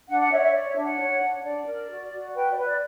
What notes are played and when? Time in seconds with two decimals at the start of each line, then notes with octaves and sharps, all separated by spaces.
0.08 D4 F#5
0.19 F#5
0.31 C#5 E5
0.38 D5
0.42 E5
0.53 C#5 D5
0.69 E5
0.76 D4
0.84 F#5
0.99 C#5
1.21 D4
1.44 D4 D5
1.66 A#4
1.89 F#4
2.12 F#4
2.35 B4 G5
2.50 D5
2.57 B4
2.65 D5